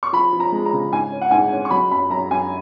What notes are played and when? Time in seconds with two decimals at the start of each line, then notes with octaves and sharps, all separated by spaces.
0.03 C#6
0.13 F3 B5
0.33 F3
0.40 A#5
0.52 G#3
0.66 A#5
0.73 C#3
0.92 G#2 G#5
1.12 C#4
1.21 F#5
1.31 G#2 G#5
1.52 C#4
1.65 C#6
1.71 F#3 B5
1.91 F#2 B5
2.10 F#2 A#5
2.30 F#2 G#5